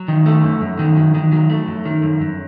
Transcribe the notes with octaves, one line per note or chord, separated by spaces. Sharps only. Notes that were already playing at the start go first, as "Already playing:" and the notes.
Already playing: F#3
D#3
A3
F#2
F#2
D#3
F#3
D#3
F#3
A3
F#2
D#3
F#2
F#2